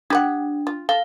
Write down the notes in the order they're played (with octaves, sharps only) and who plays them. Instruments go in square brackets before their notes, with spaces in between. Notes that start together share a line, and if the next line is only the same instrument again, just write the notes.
[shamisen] G3 B4 F#5 [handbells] D4
[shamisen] F4
[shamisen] A4 [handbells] F5